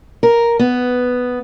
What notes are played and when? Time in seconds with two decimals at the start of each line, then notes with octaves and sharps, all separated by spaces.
0.23 A#4
0.59 B3